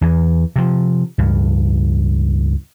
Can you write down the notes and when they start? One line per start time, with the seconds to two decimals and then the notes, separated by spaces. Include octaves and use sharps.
0.01 E2 E3
0.56 C3 F3
1.18 C#2 G2